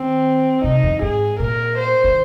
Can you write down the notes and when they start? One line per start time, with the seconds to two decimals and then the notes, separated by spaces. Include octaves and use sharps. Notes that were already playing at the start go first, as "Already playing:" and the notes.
Already playing: D#3 C4
0.64 C3 D#4
0.83 F2
1.02 G#2 G#4
1.40 A#2 A#4
1.78 C5
2.04 D#3